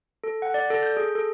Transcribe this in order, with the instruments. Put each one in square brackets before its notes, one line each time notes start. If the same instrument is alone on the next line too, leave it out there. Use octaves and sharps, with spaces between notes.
[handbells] A4
F#5
D5
A4
G6
G#4
A4